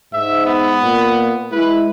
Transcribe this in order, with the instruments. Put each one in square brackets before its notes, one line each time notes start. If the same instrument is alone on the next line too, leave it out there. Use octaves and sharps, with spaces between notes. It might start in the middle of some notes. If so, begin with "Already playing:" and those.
[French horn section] G#2 [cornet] E5
[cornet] B3
[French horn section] A#2
[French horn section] G#3 E4 [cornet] B4